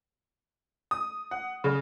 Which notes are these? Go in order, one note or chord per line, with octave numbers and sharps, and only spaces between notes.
D#6
F#5
C#3